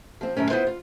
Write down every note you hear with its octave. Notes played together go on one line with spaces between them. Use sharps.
F3 C4
F#2 A2 D#3 C#4
B3 E4 F4 B4 C5
F4